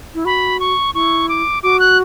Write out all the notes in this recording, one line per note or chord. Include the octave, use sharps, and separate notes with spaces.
E4
F#4 B5
C#6
E4 C#6
D6
F#4 D6
F#6